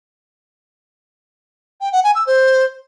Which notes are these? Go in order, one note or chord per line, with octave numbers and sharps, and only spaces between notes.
G5
F#5
G#5
E6
C5